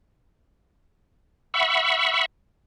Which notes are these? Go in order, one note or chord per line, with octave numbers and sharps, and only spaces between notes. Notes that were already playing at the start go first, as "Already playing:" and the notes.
E5 F#5 B5 C#6 E6